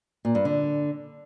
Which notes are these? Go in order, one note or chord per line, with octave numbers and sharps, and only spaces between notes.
A#2
G2
D3